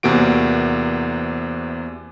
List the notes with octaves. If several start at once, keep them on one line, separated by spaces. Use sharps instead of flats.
E2 C3 A#3 F#4 D7